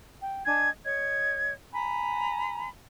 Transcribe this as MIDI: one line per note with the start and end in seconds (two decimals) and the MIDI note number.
0.21 0.43 79
0.46 0.69 62
0.46 0.69 75
0.46 0.69 80
0.46 0.69 92
0.85 1.53 73
0.85 1.53 75
0.85 1.53 92
1.73 2.68 80
1.73 2.68 82
1.73 2.68 83